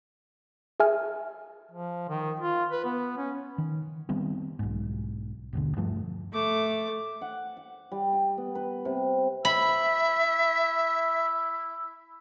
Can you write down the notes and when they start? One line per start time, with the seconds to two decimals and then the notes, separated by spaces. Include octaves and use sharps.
0.80 G#4 E5 G#5 F6
1.71 F3
2.09 D#3
2.40 F4
2.71 B4
2.85 B3
3.17 C#4
3.58 D#3
4.09 D#3 G3 B3 C4
4.59 B1 G#2
5.53 G#1 D#2 B2 D3
5.76 G2 F3 A3
6.33 A3 D6
7.21 F#5
7.57 F#5
7.92 G3
8.13 G5
8.38 B3
8.55 B4
8.85 C3
9.45 E4 E5 B5